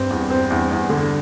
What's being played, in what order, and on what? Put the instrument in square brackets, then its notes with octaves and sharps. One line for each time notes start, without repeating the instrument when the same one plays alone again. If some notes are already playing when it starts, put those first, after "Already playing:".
Already playing: [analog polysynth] G2 [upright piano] C4
[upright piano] E2
[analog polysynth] G2 [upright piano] C4
[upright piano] E2
E2
D3